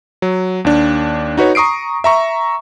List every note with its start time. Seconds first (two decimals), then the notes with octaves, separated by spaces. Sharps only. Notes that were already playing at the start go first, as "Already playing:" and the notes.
0.22 F#3
0.65 D#2 D4
1.37 D#4 F#4 B4 C#5
1.55 A#5 C#6 D#6 C7 D7
2.04 E5 A#5 C#6